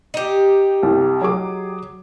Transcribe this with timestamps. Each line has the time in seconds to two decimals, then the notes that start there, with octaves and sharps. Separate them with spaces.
0.14 D#4 G4
0.83 C2
1.22 F#3 G#4 D6